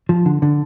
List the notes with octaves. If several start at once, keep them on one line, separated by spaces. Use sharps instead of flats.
F3
D3
D3